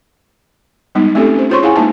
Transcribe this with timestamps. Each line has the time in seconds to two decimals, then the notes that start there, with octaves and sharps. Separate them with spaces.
0.95 G3 G#3 B3 D#4
1.15 A3 C4 C#4 D#4 G4 A4
1.36 C#4 C5
1.50 F4 G#4 C5 C#5 C6 C#6
1.62 E4 G#4 F5 F#5 G#5
1.76 G#3 A#3 D#4 A5